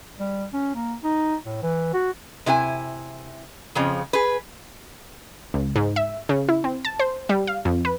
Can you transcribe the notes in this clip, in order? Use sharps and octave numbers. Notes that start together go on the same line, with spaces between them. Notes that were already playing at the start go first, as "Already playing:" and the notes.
G3
C#4
A#3
D#4
A2
E3
F#4
C3 E4 A#4 G#5
F2 C#3 F3
G#4 B4
C#2
G#2
E5
C#3
E4
C4
A5
C5
G3
F5
F2
B4